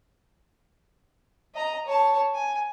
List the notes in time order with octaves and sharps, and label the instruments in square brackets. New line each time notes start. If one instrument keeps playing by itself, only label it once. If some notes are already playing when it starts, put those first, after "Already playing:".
[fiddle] D#5 A#5
C#5 A5
G#5